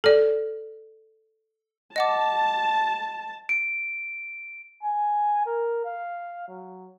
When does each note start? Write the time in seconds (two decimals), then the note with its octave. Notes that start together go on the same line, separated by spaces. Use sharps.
0.04 A4 D5
1.96 D#5 F#5 A5 D6
3.49 D7
4.83 G#5
5.46 A#4
5.84 F5
6.48 F#3